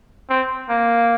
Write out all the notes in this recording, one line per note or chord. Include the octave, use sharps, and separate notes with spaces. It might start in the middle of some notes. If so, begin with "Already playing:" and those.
C4
A#3